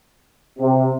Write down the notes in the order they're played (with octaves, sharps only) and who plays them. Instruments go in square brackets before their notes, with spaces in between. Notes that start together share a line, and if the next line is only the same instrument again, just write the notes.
[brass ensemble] C3